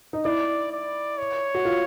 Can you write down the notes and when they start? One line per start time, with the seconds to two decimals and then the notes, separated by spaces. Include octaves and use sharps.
0.13 D#4
0.25 E4 D5
0.71 D5
1.18 C#5
1.55 F#4
1.65 F4